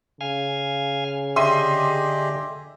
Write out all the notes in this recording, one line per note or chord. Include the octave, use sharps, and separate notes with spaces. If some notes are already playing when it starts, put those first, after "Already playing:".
C#3 F5 G#5
D3 G4 G#4 D#5 E5 C6 D#7